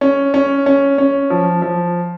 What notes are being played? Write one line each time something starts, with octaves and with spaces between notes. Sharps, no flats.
C#4
C#4
C#4
C#4
F3
F3